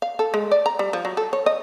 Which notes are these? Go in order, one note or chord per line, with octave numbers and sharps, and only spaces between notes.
F5
A4
G#3
D5
A#5
G3
F3
F#3
A4
C#5
D#5